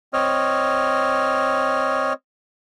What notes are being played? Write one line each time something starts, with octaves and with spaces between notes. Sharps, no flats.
C4 C#5 D#5 F6